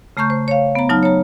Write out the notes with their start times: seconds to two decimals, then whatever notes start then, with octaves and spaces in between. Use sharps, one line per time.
0.17 C#3 A3 A#5 C#6 G6
0.30 C5
0.48 C#5 F5
0.75 B3 A#5
0.89 F#3 D#4 A5 F6
1.03 C#5 A#5